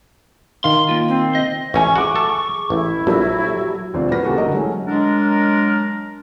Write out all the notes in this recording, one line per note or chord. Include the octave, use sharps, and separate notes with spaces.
D#3 F5 C6
A#3 F4
C4
D#5
A1 C#4 E5 G#5 C#6
F#4 G#4 D6
A4
A1 E4
A#1 F#3 G3 A3 F#4
E1 D2 C4 F4 D5
D#1 E4 F#4 B4 F6 A#6
C#3 E3 A#3 F#4 G4 A4
F#1 D3 A#4 D#5
E3 F#3 G#3 A3 C#4
F#3 G#3 D4 A#4